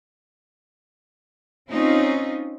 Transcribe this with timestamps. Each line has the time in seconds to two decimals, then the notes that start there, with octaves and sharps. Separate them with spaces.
1.69 C4 C#4 D#4 F4